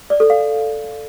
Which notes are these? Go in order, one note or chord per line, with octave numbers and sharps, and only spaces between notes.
D5
A4
F5